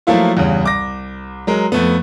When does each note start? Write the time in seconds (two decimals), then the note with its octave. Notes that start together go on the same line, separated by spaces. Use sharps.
0.07 F3 F#3 A3 A#3 E4 F4
0.37 E2 G2 C#3
0.64 C2 D6 A#6
1.47 F#3 G#3 A#4
1.72 F2 A3 B3